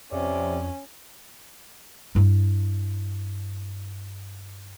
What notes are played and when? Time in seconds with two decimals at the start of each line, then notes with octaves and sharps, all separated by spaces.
0.12 F2 C3 C#4 D5
2.15 G2 E4